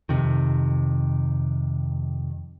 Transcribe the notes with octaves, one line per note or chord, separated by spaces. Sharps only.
F2 C3 D#3